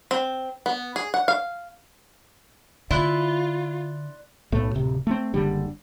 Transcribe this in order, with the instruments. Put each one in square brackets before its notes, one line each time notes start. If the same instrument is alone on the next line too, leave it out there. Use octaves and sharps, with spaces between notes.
[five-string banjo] C4
B3
G#4
F#5
F5
[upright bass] D3 [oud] E4 [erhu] F4 [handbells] D5 C6 F#6
[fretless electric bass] B1 A2 A3
D1 C3
A3 C4
F#1 D3 G3